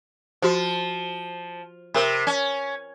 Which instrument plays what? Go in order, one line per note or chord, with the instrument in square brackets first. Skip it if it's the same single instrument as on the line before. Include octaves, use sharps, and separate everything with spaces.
[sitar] F3 [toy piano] F#4 C5
[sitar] C3 [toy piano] A#4 B5
[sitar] C#4